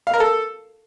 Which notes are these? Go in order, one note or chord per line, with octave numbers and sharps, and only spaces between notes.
F5
A#4
A4